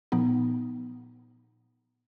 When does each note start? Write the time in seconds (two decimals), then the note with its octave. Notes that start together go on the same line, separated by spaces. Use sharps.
0.12 A#2 F3 B3 D#4